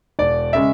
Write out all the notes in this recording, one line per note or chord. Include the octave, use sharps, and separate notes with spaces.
E1 D5
C#3 G#3 C#4 E5